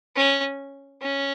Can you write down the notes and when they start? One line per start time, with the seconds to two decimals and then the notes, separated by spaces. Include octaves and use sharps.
0.16 C#4
1.02 C#4